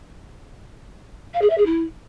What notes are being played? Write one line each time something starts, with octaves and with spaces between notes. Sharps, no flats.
F5
G#4
E5
G#4
E4